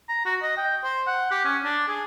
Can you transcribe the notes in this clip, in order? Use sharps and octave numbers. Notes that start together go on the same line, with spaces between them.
A#5
F#4
D#5
G5
C5
F#5
G4
C#4
D4
G#4